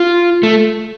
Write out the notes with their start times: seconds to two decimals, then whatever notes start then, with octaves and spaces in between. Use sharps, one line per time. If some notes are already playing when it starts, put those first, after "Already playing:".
Already playing: F4
0.43 A3